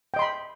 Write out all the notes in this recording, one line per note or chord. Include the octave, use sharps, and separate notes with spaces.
D#5 G5 B5 C6